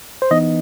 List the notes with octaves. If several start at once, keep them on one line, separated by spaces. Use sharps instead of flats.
C5
E3 B3 D#4 D#5